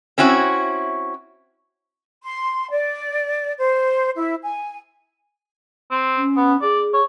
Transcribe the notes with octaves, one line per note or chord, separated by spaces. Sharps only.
C4 C#4 E4 F#4
C6
D5
C5
E4
G#5
C4
C#4
B3
G#4 D5
C#5